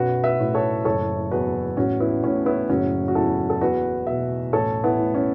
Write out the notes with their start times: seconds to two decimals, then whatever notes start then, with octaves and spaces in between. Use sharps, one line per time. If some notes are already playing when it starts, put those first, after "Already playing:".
Already playing: B1 F#2 F#4 B4
0.24 B4 E5
0.39 A2
0.55 A4 C#5
0.85 F#1 A4 C#5
1.31 E2 F#4 B4
1.77 A1 C#4 F#4
2.00 B3 E4
2.23 A2 C#4
2.46 B3 E4
2.69 F#1 C#4 F#4
3.08 F#4
3.15 E2 E4 A4
3.50 A4
3.61 E2 F#4 B4
4.07 B2 B4 E5
4.53 A1 A4 C#5
4.84 B3 E4
4.99 A2
5.14 C#4